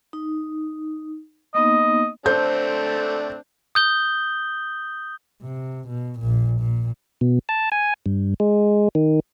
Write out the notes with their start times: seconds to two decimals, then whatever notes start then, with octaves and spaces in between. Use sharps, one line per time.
0.13 D#4
1.55 A#3 B3 D#4 D#5
2.26 A3 C4 D4 A4 C5 G6
3.75 D#6 G6 G7
5.43 C3
5.89 B2
6.20 A#1 A#2
6.61 A#2
7.21 B2
7.49 A5
7.72 G#5
8.06 G2
8.40 G#3
8.95 D#3